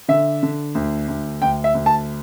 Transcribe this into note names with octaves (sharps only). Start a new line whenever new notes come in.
D3 E5
D3
D2
D2
D2 G5
E5
D2
A5